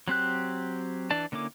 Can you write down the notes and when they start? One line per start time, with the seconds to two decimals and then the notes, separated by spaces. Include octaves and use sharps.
0.08 F#3 C4 G4 F#6
1.11 E3 D4 D5 A5
1.32 D3 A#3 C#4 E4 D6